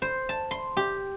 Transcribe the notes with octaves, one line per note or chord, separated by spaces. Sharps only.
C5
A5
C6
G4